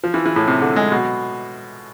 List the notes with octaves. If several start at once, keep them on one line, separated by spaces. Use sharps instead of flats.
F3
E3
E3
A2
C3
D3
G#3
B2